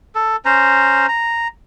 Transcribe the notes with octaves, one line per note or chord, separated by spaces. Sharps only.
A4
C#4 C5 A#5
A#5